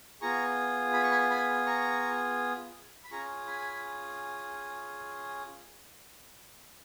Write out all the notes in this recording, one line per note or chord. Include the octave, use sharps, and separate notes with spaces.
B3 F4 G#4 A#5 C#6
B5
C#6
G#5 B5
G#5 B5
A#5 C#6
B5
C#4 F4 G#4 A#5 C#6
G#5 B5